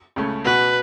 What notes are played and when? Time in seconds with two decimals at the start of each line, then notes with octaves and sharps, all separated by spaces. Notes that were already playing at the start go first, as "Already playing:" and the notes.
0.16 C#2 C#3 A3 C#4
0.45 B2 B3 F#4 B4